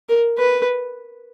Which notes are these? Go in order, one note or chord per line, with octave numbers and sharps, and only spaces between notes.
A#4
B4